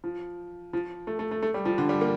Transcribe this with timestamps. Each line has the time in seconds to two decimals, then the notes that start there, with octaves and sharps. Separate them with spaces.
0.04 F3
0.73 F3
1.07 A3
1.19 A3
1.31 A3
1.42 A3
1.54 G3
1.65 F3
1.78 D3
1.89 G3
2.01 A#3